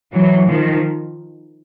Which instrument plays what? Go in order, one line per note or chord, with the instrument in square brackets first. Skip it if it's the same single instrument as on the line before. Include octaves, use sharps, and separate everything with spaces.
[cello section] E3 F#3
D#3 F3